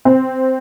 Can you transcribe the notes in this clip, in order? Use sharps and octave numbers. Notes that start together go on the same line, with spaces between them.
C4